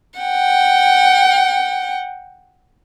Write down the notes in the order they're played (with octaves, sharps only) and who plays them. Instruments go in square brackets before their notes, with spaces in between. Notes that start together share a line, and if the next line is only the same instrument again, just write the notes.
[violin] F#5 G5